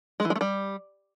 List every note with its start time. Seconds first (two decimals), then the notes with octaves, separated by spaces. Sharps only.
0.20 G#3
0.25 E3
0.30 G#3
0.36 A3
0.41 G3